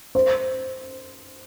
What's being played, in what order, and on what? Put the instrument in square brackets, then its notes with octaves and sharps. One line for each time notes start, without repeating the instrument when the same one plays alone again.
[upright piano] C5